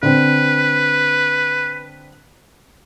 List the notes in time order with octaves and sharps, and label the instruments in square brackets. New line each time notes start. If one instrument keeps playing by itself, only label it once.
[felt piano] D3 C4 [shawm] B4